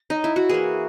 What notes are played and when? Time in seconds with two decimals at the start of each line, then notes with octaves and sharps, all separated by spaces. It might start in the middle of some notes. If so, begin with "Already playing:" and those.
Already playing: C#4
0.10 D#4
0.24 E4
0.36 F#4
0.49 E3 A#3 G#4